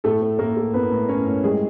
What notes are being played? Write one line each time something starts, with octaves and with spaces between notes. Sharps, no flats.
A2 A3 A4
A3
A2 A#3 A#4
A3
A2 B3 B4
A2
A2 C#4 C#5
A2
G3 G#3 G#4